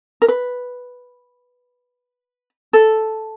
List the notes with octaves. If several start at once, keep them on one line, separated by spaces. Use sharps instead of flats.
A#4
B4
A4